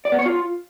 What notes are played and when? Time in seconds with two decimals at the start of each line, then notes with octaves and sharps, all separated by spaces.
0.05 D5
0.12 B3
0.19 C#5
0.26 F4